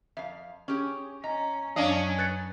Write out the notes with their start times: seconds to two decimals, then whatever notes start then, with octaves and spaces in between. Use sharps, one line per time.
0.17 F2 E5 F5
0.68 C#4 G4 G#4
1.24 C#4 D#5 A#5
1.76 F#2 F#3 C#4 D4 D#5 F5
2.19 B4 F#6 A6 C#7